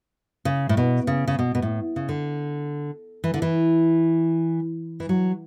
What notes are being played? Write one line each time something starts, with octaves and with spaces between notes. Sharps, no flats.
C#3
A2
B2
C#3
C#3
B2
B2
A2
C#3
D3
E3
D3
E3
E3
F#3